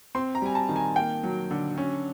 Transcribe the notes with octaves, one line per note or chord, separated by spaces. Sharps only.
C4 C6
A#5
G3 G#5
A5
D#3
G#5
A#3 G5
F#3
D3
C#4